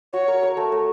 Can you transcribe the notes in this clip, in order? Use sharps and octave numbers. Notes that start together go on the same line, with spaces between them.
F#4 C#5
A#4
A#4
A3
A3